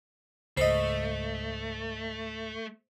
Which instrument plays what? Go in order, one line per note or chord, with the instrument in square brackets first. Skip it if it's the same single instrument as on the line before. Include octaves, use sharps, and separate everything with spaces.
[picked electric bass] C#2 G#2 [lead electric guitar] A3 [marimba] C5 [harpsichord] D#5 B5